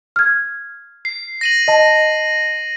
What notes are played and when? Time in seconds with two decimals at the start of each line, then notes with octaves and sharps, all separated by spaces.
0.16 F6 G#6
1.05 C7
1.41 A#6 D#7 F#7
1.68 D#5 A5